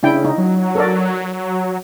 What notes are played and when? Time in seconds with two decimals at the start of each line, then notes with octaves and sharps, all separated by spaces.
0.03 C#3 D4 E4 G5
0.25 D#4
0.38 F#3
0.75 A4 A#4 D5